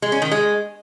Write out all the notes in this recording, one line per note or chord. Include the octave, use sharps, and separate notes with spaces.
G#3
C#4
D#3
G#3